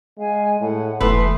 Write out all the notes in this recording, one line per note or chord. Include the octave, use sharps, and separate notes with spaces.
G#3 F5 G#5
A2 F#5
F1 E3 A3 A4 B4 C6 D#6